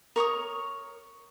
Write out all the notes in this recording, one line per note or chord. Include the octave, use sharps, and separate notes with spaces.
A#4 C#5 C#6 D#6